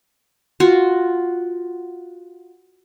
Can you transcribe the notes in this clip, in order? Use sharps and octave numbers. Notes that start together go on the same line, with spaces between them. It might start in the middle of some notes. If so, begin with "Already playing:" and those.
F4 F#4